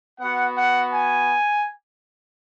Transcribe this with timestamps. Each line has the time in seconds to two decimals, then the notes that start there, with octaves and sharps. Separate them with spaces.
0.20 B3 F#4 F#5
0.56 F#5
0.92 G#5